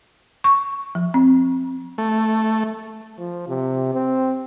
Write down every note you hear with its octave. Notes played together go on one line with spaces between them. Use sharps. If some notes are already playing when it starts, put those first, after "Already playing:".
C#6
F3
C4
A3
F3
C3
C4